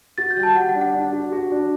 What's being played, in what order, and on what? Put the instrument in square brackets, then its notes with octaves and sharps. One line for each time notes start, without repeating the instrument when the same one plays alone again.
[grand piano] F#4 [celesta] A6
[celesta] G6
[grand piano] G3
[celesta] A5
[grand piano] G3 [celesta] F#5
[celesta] F#5
[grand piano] D4
[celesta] F#5
[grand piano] D4
F#4
F#4
D4